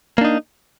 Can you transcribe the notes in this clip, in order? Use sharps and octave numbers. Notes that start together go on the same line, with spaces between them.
A#3 D4 D#4